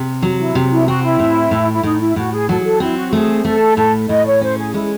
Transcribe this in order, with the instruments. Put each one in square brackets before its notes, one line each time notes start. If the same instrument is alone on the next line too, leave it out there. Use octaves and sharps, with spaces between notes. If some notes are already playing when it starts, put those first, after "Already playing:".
Already playing: [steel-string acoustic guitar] C3
F#3
[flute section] E4
[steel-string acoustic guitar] C3
[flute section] E4
[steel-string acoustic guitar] C4 [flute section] F#4
[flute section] E4
[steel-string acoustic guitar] A2
A2
[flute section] E4
[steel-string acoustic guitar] A2 [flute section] D#4
[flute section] E4
[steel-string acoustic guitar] A2 [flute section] F#4
[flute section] G#4
[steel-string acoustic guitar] F#3 [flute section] A4
[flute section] G#4
A4
[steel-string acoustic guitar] C4 [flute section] E4
[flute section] F#4
[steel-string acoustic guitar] A3 [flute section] G#4
[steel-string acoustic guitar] A3 [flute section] A4
[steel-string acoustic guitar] A2 [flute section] A4
[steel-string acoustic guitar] A2 [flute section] D#5
[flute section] C#5
[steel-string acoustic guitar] C#4 [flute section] C5
[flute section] G#4
[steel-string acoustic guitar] G#3 [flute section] E4